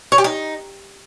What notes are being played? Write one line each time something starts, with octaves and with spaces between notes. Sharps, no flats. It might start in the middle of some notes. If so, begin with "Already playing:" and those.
C#5
G4
D#4